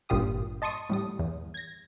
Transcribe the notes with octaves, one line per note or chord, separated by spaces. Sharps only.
G#1 G2 A#2 F4 G4 D#6
D#5 A5 C6 C#6 D#6
A2 G3 D#6
E2
G#6 A#6